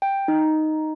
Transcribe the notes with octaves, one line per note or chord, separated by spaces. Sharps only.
G5
D#4